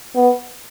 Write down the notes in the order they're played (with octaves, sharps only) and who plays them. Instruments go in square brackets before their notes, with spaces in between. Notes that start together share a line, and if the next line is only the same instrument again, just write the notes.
[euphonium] B3